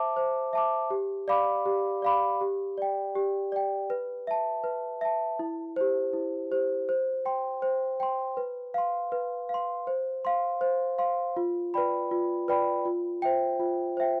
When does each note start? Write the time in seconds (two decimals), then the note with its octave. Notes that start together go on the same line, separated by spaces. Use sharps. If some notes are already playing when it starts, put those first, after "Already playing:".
Already playing: C5 E5 A5 D6
0.17 C5
0.53 E5 A5 D6
0.90 G4
1.28 D5 F5 B5 D6
1.66 G4
2.02 D5 F5 B5 D6
2.41 G4
2.78 D5 G5
3.15 G4
3.52 D5 G5
3.90 B4
4.27 E5 A5
4.64 B4
5.01 E5 A5
5.39 E4
5.76 G4 C5
6.13 E4
6.51 G4 C5
6.89 C5
7.26 G5 C6
7.62 C5
8.00 G5 C6
8.37 B4
8.74 F5 C6
9.12 B4
9.49 F5 C6
9.87 C5
10.25 F5 C6
10.61 C5
10.98 F5 C6
11.37 F4
11.74 B4 D5 G5 B5
12.11 F4
12.48 B4 D5 G5 B5
12.85 F4
13.22 C5 E5 G5
13.60 F4
13.97 C5 E5 G5